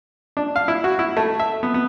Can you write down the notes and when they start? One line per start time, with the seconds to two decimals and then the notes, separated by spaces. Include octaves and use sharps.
0.37 D4
0.56 F5
0.68 E4
0.84 F#4
0.99 E4
1.17 A3
1.40 E5
1.63 B3
1.74 B3